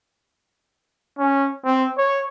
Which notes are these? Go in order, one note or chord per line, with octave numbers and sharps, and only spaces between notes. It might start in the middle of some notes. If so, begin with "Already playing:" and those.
C#4
C4
C#5